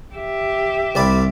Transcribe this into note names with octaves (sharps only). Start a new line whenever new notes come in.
G4 E5
C2 D5 B5